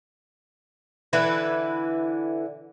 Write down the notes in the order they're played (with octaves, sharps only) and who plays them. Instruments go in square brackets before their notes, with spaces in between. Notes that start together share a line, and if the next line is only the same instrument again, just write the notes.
[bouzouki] D3 E3 E4 B4